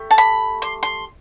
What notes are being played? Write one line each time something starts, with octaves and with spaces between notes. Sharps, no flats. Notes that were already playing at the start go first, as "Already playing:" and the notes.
Already playing: A3 G4
A5
B5
C6
C6